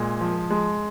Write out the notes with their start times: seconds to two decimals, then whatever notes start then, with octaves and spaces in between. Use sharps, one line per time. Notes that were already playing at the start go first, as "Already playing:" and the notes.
Already playing: A#2 G#3
0.21 F3
0.50 G#3